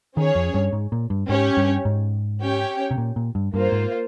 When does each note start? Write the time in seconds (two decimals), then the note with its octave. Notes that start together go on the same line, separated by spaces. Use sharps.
0.16 D#3 C#4 G#4 C#5
0.35 F2
0.54 G2
0.73 G#2
0.92 A#2
1.10 G2
1.28 G#2 C#4 G4 C#5
1.57 G2
1.85 G#2
2.41 C#4 G4 C#5 G5
2.91 C3
2.98 A#2
3.16 A#2
3.35 G2
3.54 G2 A#3 F4 C5
3.72 G#2